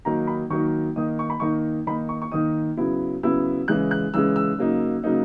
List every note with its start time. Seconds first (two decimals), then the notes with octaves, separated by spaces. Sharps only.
0.05 D#3 F#3 A#3 D#4 A#5
0.27 B5
0.50 D#3 F#3 A#3 D#4 C#6
0.96 D#3 A#3 D#4 D#6
1.19 C#6
1.30 B5
1.40 D#3 A#3 D#4 C#6
1.87 D#3 A#3 D#4 B5
2.09 C#6
2.22 C#6
2.31 D#3 A#3 D#4 D#6
2.77 C#3 F#3 B3 E4
3.23 C#3 F#3 B3 E4 E6
3.68 C#3 E3 G#3 F#6
3.91 F#6
4.14 C#3 E3 G#3 E6
4.36 E6
4.58 C#3 F#3 A#3 D#4
5.04 C#3 F#3 A#3 D#4